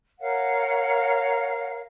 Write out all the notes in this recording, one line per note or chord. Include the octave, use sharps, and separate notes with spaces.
A#4 C#5 F5 F#5